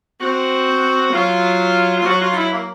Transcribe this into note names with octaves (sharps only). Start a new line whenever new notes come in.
C4 F#4
F#3 F4
F4
F#3 F#4
F4
D#4
E4
A#3